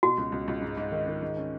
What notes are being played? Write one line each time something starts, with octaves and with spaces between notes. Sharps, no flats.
B2 F#4
C#2
C#2
C#2
G#2
G#2
D#3
D#3
G#2
C#4